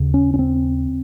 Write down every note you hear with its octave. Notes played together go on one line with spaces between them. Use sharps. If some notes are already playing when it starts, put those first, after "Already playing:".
Already playing: D#2 C#3
C#4
C#4
C4